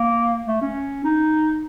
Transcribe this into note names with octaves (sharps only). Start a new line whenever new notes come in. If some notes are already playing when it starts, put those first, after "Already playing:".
Already playing: A#3
A3
C#4
D#4